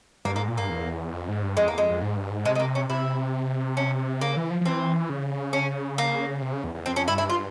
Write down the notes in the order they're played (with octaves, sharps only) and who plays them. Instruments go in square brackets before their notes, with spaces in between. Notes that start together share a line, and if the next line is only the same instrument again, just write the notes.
[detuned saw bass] G2 [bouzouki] A#3
[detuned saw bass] G#2 [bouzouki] A#3
[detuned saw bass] A#2
[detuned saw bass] G2 [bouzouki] A#3
[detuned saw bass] E2
F2
G#2
G2
[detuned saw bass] F2 [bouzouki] G#3
[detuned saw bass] E2 [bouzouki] A#3
[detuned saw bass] F2 [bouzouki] G#3
[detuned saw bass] F2
G#2
G2
G#2
[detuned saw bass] C3 [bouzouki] G#3
[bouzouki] G#3
A#3
C#4
[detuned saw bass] C3 [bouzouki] E4
[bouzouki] C#4
[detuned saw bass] C#3 [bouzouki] A#3
[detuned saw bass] E3
F3
F3
[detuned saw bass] E3 [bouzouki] C4
[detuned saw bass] C#3
[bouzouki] C#4
A#3
[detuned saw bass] C3
C#3
E2
E2
[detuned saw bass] F2 [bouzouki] C4
[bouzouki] C#4
[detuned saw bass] G2 [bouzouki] E4
[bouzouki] E4
F4